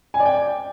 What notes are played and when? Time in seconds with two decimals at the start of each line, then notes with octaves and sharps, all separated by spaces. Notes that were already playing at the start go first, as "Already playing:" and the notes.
0.14 G#5
0.20 D5
0.26 G5